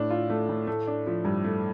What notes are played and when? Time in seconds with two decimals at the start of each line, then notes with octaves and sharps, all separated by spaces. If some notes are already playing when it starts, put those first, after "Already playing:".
Already playing: A2 A3 D4
0.10 F4
0.30 A3
0.49 A2
0.67 A3
0.87 D4
1.07 F3
1.25 G2
1.44 A3